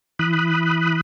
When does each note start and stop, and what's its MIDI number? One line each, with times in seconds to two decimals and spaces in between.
0.19 1.01 52
0.19 1.01 83
0.19 1.01 87
0.19 1.01 90